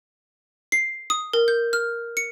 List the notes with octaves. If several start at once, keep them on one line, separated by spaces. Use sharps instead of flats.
C7
D#6
A#4
G6
F6
C#7